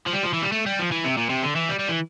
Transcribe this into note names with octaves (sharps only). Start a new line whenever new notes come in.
F3
G3
F3
E3
G3
A3
G3
F3
E3
C3
A#2
C3
D3
E3
G3
G3
E3